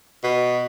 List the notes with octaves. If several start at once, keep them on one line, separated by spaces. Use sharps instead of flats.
B2